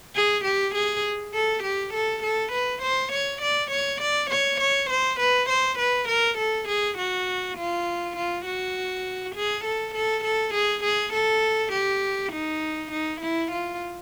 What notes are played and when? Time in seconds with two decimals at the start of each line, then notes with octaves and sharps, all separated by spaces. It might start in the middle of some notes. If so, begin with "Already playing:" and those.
0.16 G#4
0.45 G4
0.75 G#4
1.34 A4
1.64 G4
1.94 A4
2.23 A4
2.53 B4
2.83 C5
3.12 C#5
3.42 D5
3.71 C#5
4.02 D5
4.30 C#5
4.61 C#5
4.90 C5
5.20 B4
5.50 C5
5.79 B4
6.09 A#4
6.38 A4
6.68 G#4
6.98 F#4
7.58 F4
8.17 F4
8.46 F#4
9.36 G#4
9.65 A4
9.95 A4
10.25 A4
10.54 G#4
10.84 G#4
11.14 A4
11.73 G4
12.33 D#4
12.92 D#4
13.21 E4
13.52 F4